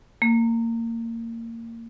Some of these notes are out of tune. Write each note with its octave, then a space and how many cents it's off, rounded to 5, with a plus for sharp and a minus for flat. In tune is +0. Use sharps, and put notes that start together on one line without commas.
A#3 -25